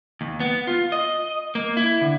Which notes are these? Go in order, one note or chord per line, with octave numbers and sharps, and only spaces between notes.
D#2
B3
F4
D#5
A#3
E4
D3